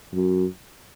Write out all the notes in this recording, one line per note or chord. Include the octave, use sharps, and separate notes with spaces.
F#2